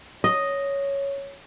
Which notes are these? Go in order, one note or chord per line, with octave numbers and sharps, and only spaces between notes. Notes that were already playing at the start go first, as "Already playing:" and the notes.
C#5 D#5